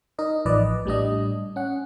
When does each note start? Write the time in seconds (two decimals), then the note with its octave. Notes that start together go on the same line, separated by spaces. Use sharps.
0.19 D#4 A#4 D#5
0.46 A1 F3 B4 D5 D#5
0.85 A2 G3 D4 D#5
1.56 C#4 F#5